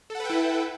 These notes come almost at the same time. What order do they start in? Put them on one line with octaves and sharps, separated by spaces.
A4 F#5 B4 G5 E4